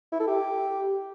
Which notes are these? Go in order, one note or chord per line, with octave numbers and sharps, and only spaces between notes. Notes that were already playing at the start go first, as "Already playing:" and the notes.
E4
A4
G4